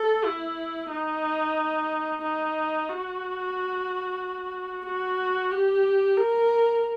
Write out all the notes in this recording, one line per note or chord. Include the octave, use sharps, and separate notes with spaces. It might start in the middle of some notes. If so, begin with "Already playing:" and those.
Already playing: A4
E4
D#4
D#4
F#4
F#4
G4
A#4